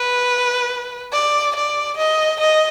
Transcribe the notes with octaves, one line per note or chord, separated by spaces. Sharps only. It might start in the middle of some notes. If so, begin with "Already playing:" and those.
Already playing: B4
D5
D5
D#5
D#5